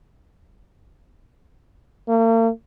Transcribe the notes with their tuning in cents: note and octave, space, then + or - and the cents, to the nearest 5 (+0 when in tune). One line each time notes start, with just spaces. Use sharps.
A#3 -45